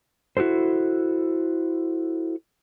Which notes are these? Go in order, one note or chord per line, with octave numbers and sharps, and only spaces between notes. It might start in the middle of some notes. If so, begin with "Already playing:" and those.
E4 F#4 G4 A4 C5